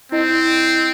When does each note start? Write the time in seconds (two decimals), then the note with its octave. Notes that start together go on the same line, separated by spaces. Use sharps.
0.12 C4 E4 D#5